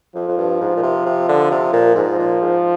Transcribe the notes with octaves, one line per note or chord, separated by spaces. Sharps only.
F2 F3
F2
G2
G#2
A#2
C3
C3
D3
C3
A#2
G#2 F3
A#2
G#2